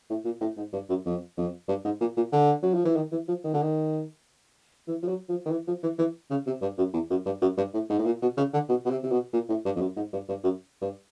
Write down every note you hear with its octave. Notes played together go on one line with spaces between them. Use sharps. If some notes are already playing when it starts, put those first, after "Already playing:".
A2
A#2
A2
G#2
G2
F#2
F2
F2
G2
G#2
A#2
A#2
D3
F#3
F3
E3
D#3
E3
F3
D#3
D3
D#3
E3
F3
F#3
F3
D#3
E3
F3
E3
E3
C#3
C3
G2
F#2
E2
F#2
G2
F#2
G2
A2
G#2
A2
A#2
B2
C#3
D3
B2
B2
C3
C3
B2
A#2
A2
G2
F2
F#2
G#2
G2
G2
F#2
G2